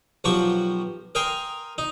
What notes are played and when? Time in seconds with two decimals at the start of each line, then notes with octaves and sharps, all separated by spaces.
0.24 B1 F3 F#4 G4 C#6
1.15 A#4 D#5 G5 G#5 A#5 C6
1.78 D#4